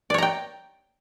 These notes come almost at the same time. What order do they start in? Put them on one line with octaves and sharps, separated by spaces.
D5 C#5 A#5 G5